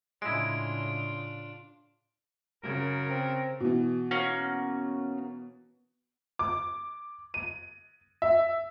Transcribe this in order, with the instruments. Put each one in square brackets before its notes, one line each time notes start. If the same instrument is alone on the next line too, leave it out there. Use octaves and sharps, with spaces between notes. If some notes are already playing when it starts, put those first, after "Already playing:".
[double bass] A2 C#3 [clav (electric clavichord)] G#3 E4 [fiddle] D4 F4 [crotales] D7
[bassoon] F#2 [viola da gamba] C#3 [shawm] A#4
[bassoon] C4
[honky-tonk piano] B2 E3
[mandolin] A#3 C#4 F#4
[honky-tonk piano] D6
D#7
E5